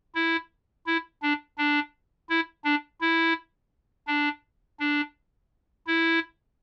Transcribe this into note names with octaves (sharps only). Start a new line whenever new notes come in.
E4
E4
D4
D4
E4
D4
E4
D4
D4
E4